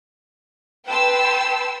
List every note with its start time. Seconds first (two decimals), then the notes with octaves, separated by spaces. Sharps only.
0.87 B4 G5 A5 C6 E6